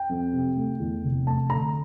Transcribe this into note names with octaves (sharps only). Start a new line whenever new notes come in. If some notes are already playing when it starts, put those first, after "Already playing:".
Already playing: G5
F2
C3
A3
E2
F1
A3 A5
D3 A#5